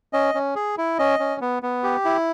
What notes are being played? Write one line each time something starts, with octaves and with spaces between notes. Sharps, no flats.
C#4 D#5
C#4
G#4
E4
C#4 D#5
C#4
B3
B3
G4
E4